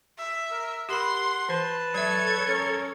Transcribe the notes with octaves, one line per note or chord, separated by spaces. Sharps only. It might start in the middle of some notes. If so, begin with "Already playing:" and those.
E5
A#4
G4 A#4 F#5 B5 C6
E3 B4 C5 A5
F#3 A4 C#5 E5 G#6
C#4 A#4